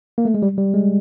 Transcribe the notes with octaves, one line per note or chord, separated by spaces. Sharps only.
A#3
A3
G#3
G3
G3
G#3